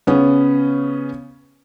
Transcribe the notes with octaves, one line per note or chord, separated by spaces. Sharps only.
C#3 B3 C#4